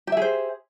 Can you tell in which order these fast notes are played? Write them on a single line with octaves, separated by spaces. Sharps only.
G4 E5 G#4 C5